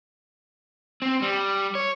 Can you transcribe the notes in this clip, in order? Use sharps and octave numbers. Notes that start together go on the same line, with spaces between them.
C4
G3
C#5